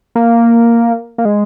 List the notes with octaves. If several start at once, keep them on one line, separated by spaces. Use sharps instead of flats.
A#3
A#3
G#3